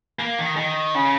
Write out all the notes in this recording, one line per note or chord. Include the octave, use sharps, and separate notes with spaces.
A#3
D#3
D#3
C#3